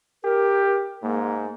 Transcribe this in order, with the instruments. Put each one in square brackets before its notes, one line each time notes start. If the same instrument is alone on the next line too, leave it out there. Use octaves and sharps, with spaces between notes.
[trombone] G4 [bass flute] A#4
[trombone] G#2 [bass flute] A#3